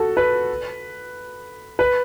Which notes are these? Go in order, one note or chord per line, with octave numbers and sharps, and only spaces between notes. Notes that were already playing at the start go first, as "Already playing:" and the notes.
Already playing: F#4 A4
B4
B4